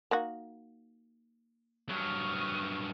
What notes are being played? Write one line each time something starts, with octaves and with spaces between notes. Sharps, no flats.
A#3 D#4 F#4
G2 F#3 C#6 D#6 F6